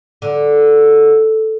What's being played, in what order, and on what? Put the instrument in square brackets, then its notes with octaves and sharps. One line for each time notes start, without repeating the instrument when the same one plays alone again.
[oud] D3